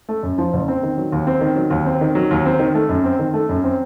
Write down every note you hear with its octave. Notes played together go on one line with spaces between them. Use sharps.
A3
F#2
F3
F#1
C4
D#3
F#3
D#2
C4
D#3
F#3
D#2
C4
D#3
F#3
D#2
C4
D#3
A3
F#2
C4
D#3
A3
F#2
C4